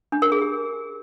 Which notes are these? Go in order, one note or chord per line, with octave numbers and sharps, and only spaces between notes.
D4
A#4
G#4
G4